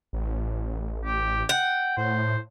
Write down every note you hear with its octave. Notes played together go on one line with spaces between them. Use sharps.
A1
G4
F#5 G5
A2 C5